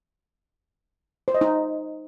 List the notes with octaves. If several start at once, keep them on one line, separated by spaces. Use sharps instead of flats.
C5
D#5
D#4